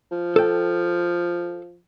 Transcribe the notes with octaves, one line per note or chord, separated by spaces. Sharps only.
F3
A4 G5